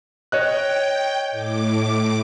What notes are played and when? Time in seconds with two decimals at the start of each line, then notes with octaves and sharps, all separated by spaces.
0.32 C#5 D#5 G5 F#6
1.31 A2 D6